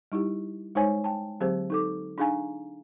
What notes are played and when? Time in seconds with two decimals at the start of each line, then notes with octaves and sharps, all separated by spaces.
0.12 G3 D#4 E4 G4
0.75 G#3 D#4 C5 C#5 G#5
1.04 G5 A5
1.40 D3 F#3 C4 G4 G#4 C5
1.70 D#4 A4 D6
2.18 D4 D#4 G#4 F5 G#5 A#5